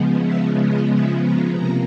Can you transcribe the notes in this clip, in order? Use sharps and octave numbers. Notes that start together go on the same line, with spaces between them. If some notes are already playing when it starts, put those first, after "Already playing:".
Already playing: C#3 F3 G#3 B3
E5
D#5
E5
A#5
C3 F3 A#3 A#5